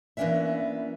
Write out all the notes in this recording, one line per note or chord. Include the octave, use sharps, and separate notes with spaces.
E3 A#3 B3 C#4 D4 E5